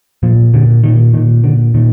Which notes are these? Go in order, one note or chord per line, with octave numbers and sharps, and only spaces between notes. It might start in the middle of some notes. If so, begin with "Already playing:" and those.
A#2 F3
A#2 D3
A#2 D#3
A#2 D#3
A#2 D3
A#2 D#3